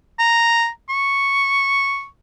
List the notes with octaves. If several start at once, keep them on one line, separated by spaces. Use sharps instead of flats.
A#5
C#6